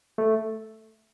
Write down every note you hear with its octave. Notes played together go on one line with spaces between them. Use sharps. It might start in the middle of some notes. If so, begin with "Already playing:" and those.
A3